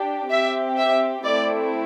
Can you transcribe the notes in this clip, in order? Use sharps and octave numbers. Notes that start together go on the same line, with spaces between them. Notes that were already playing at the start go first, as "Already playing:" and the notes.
Already playing: D4 G4
C4 G4 E5
E5
A3 C4 E4 D5